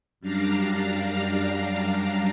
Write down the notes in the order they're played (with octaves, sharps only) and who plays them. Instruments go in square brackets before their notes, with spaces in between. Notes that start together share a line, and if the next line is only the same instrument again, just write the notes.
[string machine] F#2 G3 D4 F5 A#5